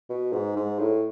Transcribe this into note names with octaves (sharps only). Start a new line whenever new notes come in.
B2
G#2
G#2
A2